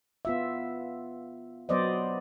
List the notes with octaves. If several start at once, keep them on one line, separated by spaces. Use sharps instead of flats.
B3 F4 E5
F#3 B3 C5 D5 D#5